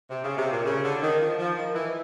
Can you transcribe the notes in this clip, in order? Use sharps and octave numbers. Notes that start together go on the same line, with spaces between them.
C3
C#3
C3
A#2
C#3
D3
D#3
F3
F3
D#3
E3